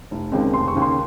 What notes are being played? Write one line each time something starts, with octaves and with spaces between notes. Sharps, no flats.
F1
D#2 C#3 G#3 C4
F1 C6
C#6
D#2 C#3
C6